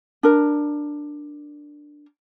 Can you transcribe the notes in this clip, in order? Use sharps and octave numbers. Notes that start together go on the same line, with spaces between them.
D4 A#4